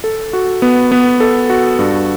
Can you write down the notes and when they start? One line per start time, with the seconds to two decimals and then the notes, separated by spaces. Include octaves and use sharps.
0.04 A4
0.33 F#4
0.62 B3
0.92 B3
1.20 A4
1.50 F#4
1.79 G2